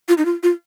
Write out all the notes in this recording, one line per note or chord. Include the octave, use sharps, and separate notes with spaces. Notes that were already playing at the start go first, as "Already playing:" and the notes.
F4
D#4
F4
F4